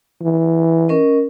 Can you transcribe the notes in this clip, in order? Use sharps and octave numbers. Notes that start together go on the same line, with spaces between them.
E3
C#4 A#4 D#5